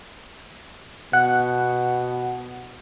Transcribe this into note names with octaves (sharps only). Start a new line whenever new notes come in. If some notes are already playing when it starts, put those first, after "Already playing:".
B2 F#5